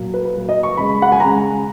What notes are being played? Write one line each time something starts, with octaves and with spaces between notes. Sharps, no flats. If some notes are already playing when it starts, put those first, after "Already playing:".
Already playing: A#2 F#3
B4
B4
A#2 F#3
D#5
C#6
C#3 G#3 B5
F#5
G#5
C#3 G#3 A#5